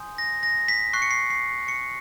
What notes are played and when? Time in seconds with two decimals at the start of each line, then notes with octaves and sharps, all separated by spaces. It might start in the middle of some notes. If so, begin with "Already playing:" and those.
Already playing: G#5 C6 D#6 G6
0.18 A#6
0.43 A#6
0.68 B6
0.93 C#6 F#6 C7
1.02 C#7
1.11 C7
1.30 C7
1.68 C#7